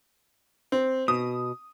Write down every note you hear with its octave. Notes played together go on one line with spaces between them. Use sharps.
C4
B2 D#6